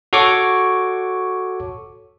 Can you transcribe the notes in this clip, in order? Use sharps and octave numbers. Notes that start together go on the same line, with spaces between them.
F#4 A4 C#5 C#6 D6